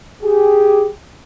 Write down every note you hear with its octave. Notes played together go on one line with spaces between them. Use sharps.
G4 G#4